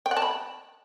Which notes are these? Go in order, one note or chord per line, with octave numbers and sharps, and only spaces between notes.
G5
F#5
A5
B5